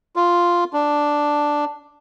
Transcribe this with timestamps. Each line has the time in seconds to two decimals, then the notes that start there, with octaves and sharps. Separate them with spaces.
0.16 F4
0.73 D4